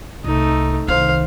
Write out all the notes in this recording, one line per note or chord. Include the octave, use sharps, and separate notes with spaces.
C2 A3 D#4
C2 D#3 C5 F5